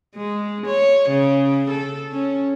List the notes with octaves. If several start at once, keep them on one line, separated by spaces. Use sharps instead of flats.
G#3
C#5
C#3
A4
C#4